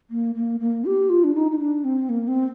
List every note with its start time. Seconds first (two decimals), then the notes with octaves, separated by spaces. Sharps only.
0.10 A#3
0.35 A#3
0.60 A#3
0.85 G4
1.09 F4
1.24 D4
1.35 D#4
1.51 D#4
1.59 D4
1.84 C4
2.09 A#3
2.28 C4